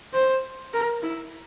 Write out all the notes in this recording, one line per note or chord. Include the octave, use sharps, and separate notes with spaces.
C5
A#4
E4